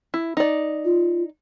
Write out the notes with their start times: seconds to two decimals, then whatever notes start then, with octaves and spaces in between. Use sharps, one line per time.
0.14 E4
0.37 D#4 D5
0.85 F4